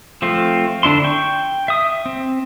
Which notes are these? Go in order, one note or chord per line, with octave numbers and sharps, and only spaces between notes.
F3 A3 C4 F4
D3 D4 E4 C6
G5 C#6
E5 D#6
C4